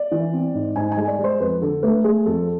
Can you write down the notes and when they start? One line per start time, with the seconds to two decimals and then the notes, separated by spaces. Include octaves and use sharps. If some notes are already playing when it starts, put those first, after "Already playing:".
Already playing: D5
0.11 E3
0.33 C4
0.54 G#2
0.76 G#2 G#5
0.92 G#5
0.97 G#3
1.08 D5
1.19 G#3
1.24 C5
1.40 F2 B4
1.61 D3 A4
1.83 A3 B4
2.04 A3 G#4
2.26 F2 A4